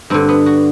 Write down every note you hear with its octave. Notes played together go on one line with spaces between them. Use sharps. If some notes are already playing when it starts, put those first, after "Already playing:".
G2 D3 C4
B3
F#4